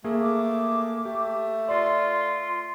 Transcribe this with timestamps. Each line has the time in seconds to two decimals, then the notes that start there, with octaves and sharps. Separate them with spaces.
0.04 A3 A#3 G#4
0.22 D6
1.05 A3 G4
1.68 F4 D5 C6